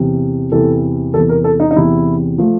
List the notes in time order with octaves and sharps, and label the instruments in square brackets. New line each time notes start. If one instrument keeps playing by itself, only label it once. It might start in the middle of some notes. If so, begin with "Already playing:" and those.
Already playing: [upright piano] E2 C3 E3
E2 C3 E3 A4
E2 C3 E3 A4
A#4
A4
D#4
D#4
E2 C3 E3 E4
F3 A3